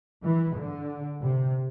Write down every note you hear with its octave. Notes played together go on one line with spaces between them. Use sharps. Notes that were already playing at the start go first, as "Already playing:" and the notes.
E3
D3
C3